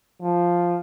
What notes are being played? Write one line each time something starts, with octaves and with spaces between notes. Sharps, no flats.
F3